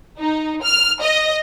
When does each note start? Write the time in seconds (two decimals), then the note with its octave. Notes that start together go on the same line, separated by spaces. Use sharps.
0.20 D#4
0.64 F6
1.02 D#5